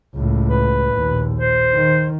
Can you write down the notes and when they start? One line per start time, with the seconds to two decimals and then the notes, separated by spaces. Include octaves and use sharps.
0.15 C#2 A2
0.50 B4
0.95 A#1 D#2
1.40 C5
1.74 D#3